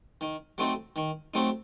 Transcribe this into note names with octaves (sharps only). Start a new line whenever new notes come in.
D#3
F#3 A3 C4 D#4
D#3
F#3 A3 C4 D#4